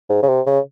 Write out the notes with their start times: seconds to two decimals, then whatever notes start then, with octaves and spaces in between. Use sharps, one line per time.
0.10 G#2
0.23 C#3
0.28 C3
0.47 C#3